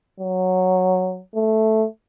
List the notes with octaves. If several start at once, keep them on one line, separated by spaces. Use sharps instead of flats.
F#3
A3